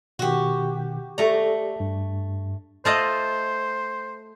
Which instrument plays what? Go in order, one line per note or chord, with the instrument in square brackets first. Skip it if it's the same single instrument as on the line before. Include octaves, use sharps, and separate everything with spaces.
[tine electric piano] B2 D#3 [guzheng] F#4 G4
[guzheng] A3 A#5 [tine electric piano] G4 A4 D5
[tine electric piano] G2
[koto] A3 F4 D#5 [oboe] C5